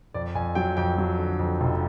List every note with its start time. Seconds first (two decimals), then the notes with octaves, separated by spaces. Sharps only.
0.14 F2 D5
0.35 F2 G#5
0.55 F#3 G5
0.77 F2 G5
0.98 F#3
1.18 D3
1.39 F2
1.61 F1